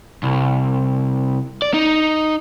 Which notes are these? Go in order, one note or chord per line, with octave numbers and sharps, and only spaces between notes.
C2
D5
D#4